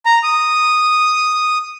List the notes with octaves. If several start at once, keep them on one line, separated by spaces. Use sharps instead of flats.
A#5
D#6